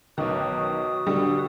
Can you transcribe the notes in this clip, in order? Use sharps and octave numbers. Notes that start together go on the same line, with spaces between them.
B1 D#3 F#4 B4 D#6
D3 G3